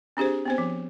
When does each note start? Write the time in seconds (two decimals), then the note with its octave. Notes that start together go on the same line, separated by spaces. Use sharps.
0.17 C4 D4 G4 G#4 C5
0.45 B3 C4 C5
0.58 F3